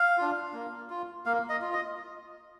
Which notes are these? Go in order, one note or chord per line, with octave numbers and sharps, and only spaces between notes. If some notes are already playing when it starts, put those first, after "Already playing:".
Already playing: F5
D4 F4
A#3
F4
A#3 F5
D#5
F4
D#5